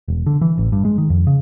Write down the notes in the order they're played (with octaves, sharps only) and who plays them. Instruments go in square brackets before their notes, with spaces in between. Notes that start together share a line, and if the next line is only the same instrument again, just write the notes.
[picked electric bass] E1
D3
E3
A1
G2
G#3
D#3
F2
C#3